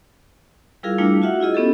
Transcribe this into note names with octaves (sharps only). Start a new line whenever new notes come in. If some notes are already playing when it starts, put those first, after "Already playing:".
G3 E4 F4 G#4 A#4 F5
G3 A3 D4 E4 F4
F4 F#4 E5 F#5
E4 F4 G#4 D#5
B3 C#4 G4 A4